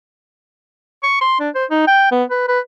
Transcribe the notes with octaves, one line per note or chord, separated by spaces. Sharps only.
C#6
C6
D4
C5
D#4
G5
B3
B4
B4